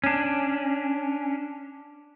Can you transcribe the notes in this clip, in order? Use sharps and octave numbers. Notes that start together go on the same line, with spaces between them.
C#4 D4